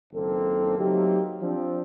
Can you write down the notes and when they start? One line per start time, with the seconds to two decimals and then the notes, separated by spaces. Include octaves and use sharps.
0.13 F#1 D#3 A#3 C4 A4
0.78 F#3 A3 A#3 C4 D#4 G4
1.41 F3 C4 D4